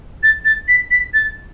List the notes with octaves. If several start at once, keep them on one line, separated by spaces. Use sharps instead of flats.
A6
A6
B6
B6
A6